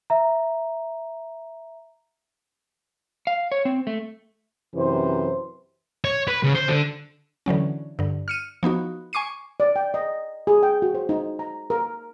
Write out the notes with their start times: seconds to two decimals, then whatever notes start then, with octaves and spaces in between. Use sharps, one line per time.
0.10 E5 A#5
3.27 F5
3.52 C#5
3.65 C4
3.87 A3
4.76 F#2 C3 E3 C5
6.04 C#5
6.28 B4
6.43 C#3
6.55 C5
6.68 D3
7.46 D3 E3 F#3 C#4
7.99 G2 D3
8.28 F6 C#7 D#7
8.63 F3 B3 D#4 F#4
9.13 G#5 C#6 D6 C7 D#7
9.60 D5
9.76 G5
9.94 D#5
10.47 G#4
10.63 G5
10.82 F#4
10.95 C5
11.09 D#4
11.39 A#5
11.70 A#4